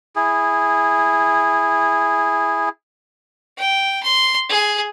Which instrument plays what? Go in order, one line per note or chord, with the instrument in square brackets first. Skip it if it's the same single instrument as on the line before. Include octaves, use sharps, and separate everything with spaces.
[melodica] E4 G#4
[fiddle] G5
C6
G#4